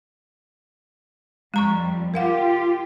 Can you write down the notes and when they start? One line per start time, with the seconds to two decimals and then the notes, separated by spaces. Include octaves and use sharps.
1.54 F2 G3 G#3 A#5 C#6
2.14 F4 G4 A#4 F5 F#5